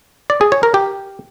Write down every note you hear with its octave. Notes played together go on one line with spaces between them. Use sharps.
D5
G#4
C#5
A#4
G4